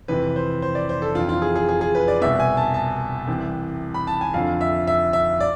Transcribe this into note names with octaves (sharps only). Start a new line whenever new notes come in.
F2 C3 E3 B4
C5
C5
D5
C5
A4
F2 E3 F4
F4
G#4
G#4
G#4
G#4
B4
D5
C2 B2 E5
G#5
A5
A5
C2 C3 E3
B5
A5
G#5
F2 D3 F3 F5
E5
E5
E5
D5